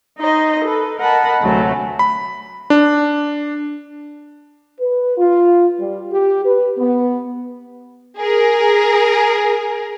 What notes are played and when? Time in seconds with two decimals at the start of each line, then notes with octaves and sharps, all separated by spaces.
0.17 D#4 C5 D#5
0.64 A4 B4
0.98 A#4 D#5 F#5 A5 B5
1.41 D2 C3 F#3 G#3 A3
1.99 B5
2.70 D4
4.79 B4
5.17 F4
5.79 G3
6.11 G4
6.45 B4
6.77 B3
8.19 G#4 A#4